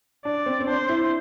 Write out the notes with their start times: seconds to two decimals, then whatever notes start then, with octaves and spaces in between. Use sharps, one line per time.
0.25 D4 D5
0.46 C4
0.60 C4
0.67 D4 C5
0.89 E4